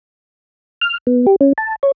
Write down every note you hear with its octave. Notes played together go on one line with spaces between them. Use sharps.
F6
B3
G4
C#4
A5
C#5